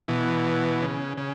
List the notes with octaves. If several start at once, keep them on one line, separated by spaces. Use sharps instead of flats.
B2 E3
C#3
C#3